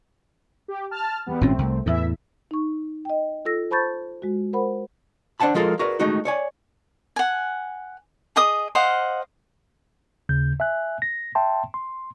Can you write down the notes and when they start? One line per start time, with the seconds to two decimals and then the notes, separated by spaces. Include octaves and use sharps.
0.68 G4
0.91 A5 F6
1.26 E2 G3 B3
1.41 G#1 A#2 A3 C4 C#4
1.58 C2
1.86 E2 A2 E3 E4 E5
2.51 D#4 C#6
3.05 D#5 G5
3.45 F4 A4 E6 A#6
3.71 C5 A5 B5 C#6 G6 A6
4.22 G#3 F#4
4.53 A#4 C5 F#5 B5
5.40 D4 C5 F#5 A5 B5
5.55 F3 G#3 F4 A4 A#4
5.79 F#4 G#4 A#4 B4 D5
6.00 G#3 A3 D#4 F#4
6.25 C#5 D5 G#5
7.16 F#5 G#5
8.36 G#4 D#5 D#6
8.75 C5 D#5 F5 F#5
10.29 D#2 C#3 G6
10.60 E5 G#5 F#6
11.02 A#6
11.35 E5 G5 A5 C6
11.74 C6